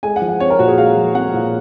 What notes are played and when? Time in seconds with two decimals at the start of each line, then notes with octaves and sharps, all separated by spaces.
0.03 G#3 G#5
0.16 F#5
0.22 F3
0.29 F#5
0.40 C4 C#5
0.50 A#4
0.59 A#2 F#4
0.68 G#4
0.78 G#3 F5
0.97 F3
1.15 C4 F#5
1.34 A#2